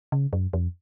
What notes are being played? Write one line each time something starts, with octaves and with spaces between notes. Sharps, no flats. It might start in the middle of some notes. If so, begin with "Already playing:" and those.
C#3
F#2
F2